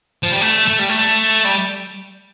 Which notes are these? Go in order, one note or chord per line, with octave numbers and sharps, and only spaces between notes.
F3
G3
A3
A3
G3
A3
G3